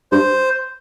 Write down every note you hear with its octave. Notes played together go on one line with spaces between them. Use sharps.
G2 C5